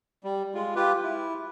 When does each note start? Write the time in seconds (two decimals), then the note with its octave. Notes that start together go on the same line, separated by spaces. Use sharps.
0.24 G3
0.54 G#3 F4
0.76 F4 G4 B4
1.03 E4